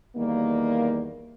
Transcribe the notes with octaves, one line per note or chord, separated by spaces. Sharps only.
E2 D#3 G3 A#3